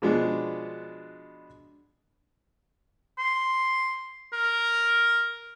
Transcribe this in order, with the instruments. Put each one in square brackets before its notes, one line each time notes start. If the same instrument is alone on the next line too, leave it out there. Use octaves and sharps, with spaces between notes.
[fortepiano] B2 F3 G#3 B3 D4
[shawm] C6
A#4